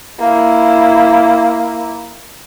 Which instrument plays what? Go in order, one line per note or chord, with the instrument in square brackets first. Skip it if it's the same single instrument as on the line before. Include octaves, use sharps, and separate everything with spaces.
[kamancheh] A#3 E4